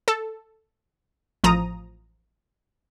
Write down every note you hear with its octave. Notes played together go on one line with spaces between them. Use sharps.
A4
A1 F3 A#5 D#6